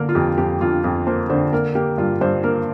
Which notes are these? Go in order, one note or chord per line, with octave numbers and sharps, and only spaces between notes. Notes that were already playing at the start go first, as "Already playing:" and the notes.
Already playing: D3 A#3 A#4
F4
F2 G4
F2 G4
F2 F4
F2
A#3 C5
D3 C5
A#3 A#4
A#3 G4
G2 F4
G2 C5
A#3 A#4